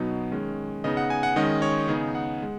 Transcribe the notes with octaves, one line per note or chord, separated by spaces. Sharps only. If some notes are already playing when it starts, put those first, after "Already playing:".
Already playing: B2 F#3 B3 D#4
D#3 G#3 C#4
C#3 B3 D#4 D#5
F#5
G#5
F#5
D#3 G#3 C#4 D#5
C#5
C#3 B3 D#4 G#4
F#5
G#3